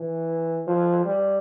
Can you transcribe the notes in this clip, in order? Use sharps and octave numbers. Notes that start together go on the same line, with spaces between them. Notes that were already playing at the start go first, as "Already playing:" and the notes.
Already playing: E3
F3
G3